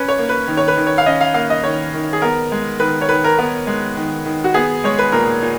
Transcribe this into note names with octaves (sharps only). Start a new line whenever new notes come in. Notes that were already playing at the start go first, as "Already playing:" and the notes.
Already playing: C#4 B4
C#5
A#3
B4
D#3
C#5
B4
D#3
C#5
F5
C#4 D#5
F5
A#3 F5
D#5
D#3 C#5
D#3
G#4
B3 A#4
G#3
D#3 B4
C#5
D#3 B4
A#4
B3 A#4
G#3
D#3
D#3
F#4
B3 G#4
G#3 C#5
B4
A#2 A#4
A#2